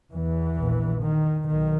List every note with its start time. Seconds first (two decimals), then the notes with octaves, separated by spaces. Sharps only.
0.13 E2 E3
0.58 A#1 A#2
1.04 D#3
1.48 B1 D#3